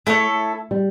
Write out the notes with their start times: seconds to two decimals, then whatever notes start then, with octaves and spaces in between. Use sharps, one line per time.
0.07 A3 E4 A4 C#5
0.71 G3